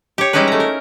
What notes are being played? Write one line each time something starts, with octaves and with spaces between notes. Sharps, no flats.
G4 C#5
G3 G#3 C#4 D#4 E4 B4
A3 A#5
A#4